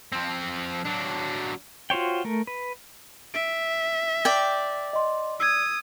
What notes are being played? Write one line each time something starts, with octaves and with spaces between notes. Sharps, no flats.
F3 C4
F#3 D4
F4 F#4 C5 C#5 G5
A3 A#4
B4
E5 D7
D5 G5
D#5 C6
D#6 E6 G#6